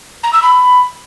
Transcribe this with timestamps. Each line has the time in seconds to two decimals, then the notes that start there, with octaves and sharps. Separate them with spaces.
0.23 A#5
0.33 E6
0.42 B5